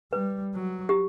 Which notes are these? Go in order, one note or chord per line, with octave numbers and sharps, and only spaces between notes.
G3 B4
F#3
G4